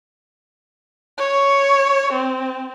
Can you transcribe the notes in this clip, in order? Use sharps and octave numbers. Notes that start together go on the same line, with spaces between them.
C#5
C4